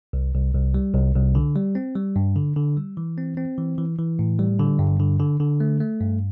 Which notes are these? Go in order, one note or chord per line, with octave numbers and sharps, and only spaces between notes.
C2
C2
C2
G3
C2
C2
D3
G3
C4
G3
G2
D3
D3
G3
E3
C4
C4
E3
E3
E3
A2
G3
D3
G2
D3
D3
D3
A3
A3
G2